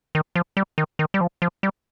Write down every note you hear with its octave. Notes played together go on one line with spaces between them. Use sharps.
D#3
F3
G3
D#3
D#3
G3
F3
F3
G3